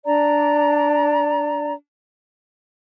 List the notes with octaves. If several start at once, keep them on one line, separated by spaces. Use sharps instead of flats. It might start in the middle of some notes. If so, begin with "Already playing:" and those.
D4 D5 A#5